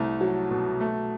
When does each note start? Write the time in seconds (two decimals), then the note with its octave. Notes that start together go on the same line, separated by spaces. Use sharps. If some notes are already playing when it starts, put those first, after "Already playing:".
Already playing: C2 A3
0.21 F#3
0.51 B2
0.80 A3